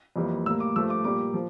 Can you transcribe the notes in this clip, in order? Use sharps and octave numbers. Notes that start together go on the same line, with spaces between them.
F2 E3 G3 A#3
A2 G3 A#3 E6
D6
G2 F3 A3 E6
D6
A#2 G3 A#3 D6
F3